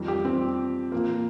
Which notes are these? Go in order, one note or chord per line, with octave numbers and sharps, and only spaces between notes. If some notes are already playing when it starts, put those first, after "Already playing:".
Already playing: F2 D#3 G3
G4
C4
A#2 F3 A#3